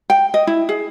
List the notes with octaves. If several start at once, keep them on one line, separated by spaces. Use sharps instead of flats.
G5
D#5
E4
G#4